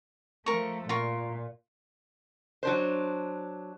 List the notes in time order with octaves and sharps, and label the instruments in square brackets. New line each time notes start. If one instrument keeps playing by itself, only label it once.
[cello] F3 A3 [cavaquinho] A#4 C#6
[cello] A#2 [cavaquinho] F4 A#4 C#6
[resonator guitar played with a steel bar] F#3 D4 C5